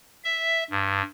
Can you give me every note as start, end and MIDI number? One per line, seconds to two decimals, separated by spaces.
0.24 0.64 76
0.70 1.02 43